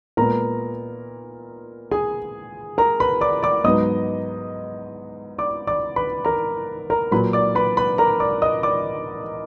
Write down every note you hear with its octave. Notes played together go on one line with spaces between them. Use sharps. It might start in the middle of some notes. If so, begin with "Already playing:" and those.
A#2 G#3 B3 A#4 A#5
G#4 G#5
A#4 A#5
B4 B5
D5 D6
D5 D6
G#2 F#3 B3 D#5 D#6
D5 D6
D5 D6
B4 B5
A#4 A#5
A#4 A#5
A#2 F#3 A#3 B4 B5
D5 D6
B4 B5
B4 B5
A#4 A#5
D5 D6
D#5 D#6
D5 D6